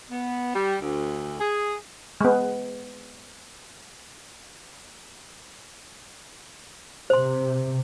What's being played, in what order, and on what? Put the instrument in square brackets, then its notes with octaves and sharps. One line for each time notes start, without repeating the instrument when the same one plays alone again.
[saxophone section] B3
G3
D2
G#4
[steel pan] G#3 B3
[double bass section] C3 [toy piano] C5 C6